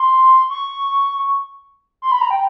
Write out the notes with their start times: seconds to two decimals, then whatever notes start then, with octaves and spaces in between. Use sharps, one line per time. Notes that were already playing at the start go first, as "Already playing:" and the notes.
Already playing: C6
0.50 C#6
2.02 C6
2.12 B5
2.21 A#5
2.31 G5